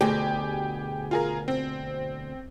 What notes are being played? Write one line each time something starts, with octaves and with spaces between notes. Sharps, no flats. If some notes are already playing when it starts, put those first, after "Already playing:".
D2 B2 G4 G#4
F4 G#4 A#4
C4